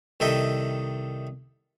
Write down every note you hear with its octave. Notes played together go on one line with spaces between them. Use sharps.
C2 D#3 A4 D#5 E5 G5